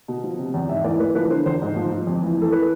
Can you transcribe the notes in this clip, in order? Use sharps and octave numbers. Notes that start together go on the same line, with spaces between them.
B2
F3
C3
E2
G#2 E5
E3 D5
E3 B4
F3 B4
D3 C5
E2 C5
G#2
F3
F3
F2
E3
E3 A4
B4